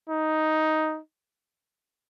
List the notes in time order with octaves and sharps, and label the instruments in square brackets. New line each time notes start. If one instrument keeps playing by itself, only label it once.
[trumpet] D#4